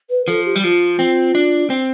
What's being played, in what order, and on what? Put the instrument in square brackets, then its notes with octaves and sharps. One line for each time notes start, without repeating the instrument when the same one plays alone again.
[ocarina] B4
[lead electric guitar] F3 [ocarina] A4
[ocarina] G4
[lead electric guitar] G3
[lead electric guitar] F3 [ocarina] F4
[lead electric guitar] C4
D4
C4